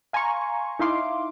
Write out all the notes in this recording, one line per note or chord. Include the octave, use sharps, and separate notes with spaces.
F5 G#5 A#5 C6 C#6
D#4 E4 F5 C6 D6